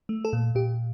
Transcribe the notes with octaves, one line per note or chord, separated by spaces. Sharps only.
A3
A4
A#2
A#2 G4